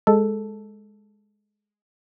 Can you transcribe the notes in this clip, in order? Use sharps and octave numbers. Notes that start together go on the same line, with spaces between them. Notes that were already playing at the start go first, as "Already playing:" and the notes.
G#3 A4